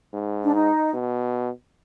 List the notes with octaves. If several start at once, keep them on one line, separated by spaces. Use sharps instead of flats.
G#2
D4
D#4
B2